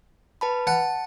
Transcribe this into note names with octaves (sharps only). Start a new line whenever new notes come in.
B4 A5 B5
F#5 A5